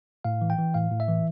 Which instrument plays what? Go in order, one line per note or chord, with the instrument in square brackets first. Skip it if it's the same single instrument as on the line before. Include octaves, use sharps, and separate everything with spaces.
[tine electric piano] A2 F5
E3
G5
E3
A2 F5
A2
E5
E3